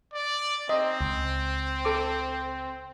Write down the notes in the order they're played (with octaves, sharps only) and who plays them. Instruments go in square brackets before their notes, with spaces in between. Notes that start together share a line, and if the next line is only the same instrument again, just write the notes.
[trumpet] D5
[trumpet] C4 [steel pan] D#5
[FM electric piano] C#2
[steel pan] A4 D6